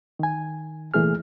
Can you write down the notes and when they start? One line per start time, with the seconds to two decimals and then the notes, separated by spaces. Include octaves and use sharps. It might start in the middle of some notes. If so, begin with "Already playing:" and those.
0.19 D#3 G#5
0.94 C2 A#2 E3 A3 G#4 F6